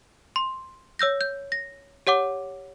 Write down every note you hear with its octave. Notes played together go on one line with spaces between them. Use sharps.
C6
C#5 E6 G6 A#6
G6
A#6
G4 C#5 F#5 D6